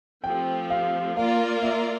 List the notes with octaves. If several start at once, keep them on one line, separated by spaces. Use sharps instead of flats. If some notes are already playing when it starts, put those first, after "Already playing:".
F3 A3 C4 G4 G5
F5
A#3 F4 A#4 D5 F5
E5